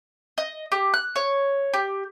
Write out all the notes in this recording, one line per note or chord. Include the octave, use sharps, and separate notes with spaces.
D#5
G4
F#6
C#5
G4